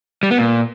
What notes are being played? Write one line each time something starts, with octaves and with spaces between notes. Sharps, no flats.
G3
B3
A#2